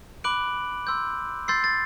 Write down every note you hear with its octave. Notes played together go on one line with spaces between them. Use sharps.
B5 D6 F#6 D7 F#7
C6 E6 G6
C6 E6 G6 A6 C7
A6